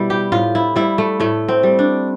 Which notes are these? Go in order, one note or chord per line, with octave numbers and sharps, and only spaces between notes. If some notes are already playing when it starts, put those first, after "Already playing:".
Already playing: B2 G3 E4
G4
A2 F4
E4
G3 E4
A3
A2 A3
C4
G3
D4